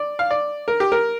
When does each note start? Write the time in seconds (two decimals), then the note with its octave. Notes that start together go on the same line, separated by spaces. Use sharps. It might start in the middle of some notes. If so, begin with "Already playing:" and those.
Already playing: D5
0.19 F5
0.31 D5
0.68 A#4
0.80 G4
0.92 A#4